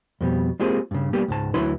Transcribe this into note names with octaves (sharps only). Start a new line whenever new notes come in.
F2 B2 G3
G#3 A#3 C4 F4 G4 G#4
G2 C#3
G3 A#3 B3 G4
C#2 G#2 A5
D2 F#3 E4 B4 C#5 C6